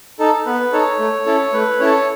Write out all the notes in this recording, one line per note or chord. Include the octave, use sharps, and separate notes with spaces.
D#4 A4
B3 B4
D#4 A4 C#5
A3
C#4 E4 A4
A3 B4
C#4 E4 A4 C#5